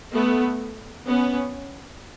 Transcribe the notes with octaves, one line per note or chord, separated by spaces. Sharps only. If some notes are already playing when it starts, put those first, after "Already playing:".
A3 B3
B3 C#4